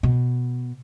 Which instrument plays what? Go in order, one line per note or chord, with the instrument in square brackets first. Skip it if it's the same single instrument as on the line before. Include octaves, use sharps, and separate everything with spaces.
[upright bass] B2